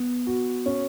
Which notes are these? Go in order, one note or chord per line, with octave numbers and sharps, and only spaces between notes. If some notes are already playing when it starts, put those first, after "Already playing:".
Already playing: B3
F#4
C#4